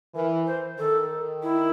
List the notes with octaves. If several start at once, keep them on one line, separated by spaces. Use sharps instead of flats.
E3 A#4
C5
D#3 A4
E4